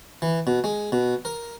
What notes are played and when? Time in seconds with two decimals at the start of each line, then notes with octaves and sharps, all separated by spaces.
0.22 E3
0.47 B2
0.64 G#3
0.92 B2
1.25 A#4